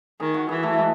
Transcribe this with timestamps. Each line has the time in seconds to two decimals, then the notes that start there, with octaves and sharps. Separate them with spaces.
0.20 D#3 G#4
0.34 F#4
0.49 E3 G#4
0.63 A3
0.73 A3
0.79 G#3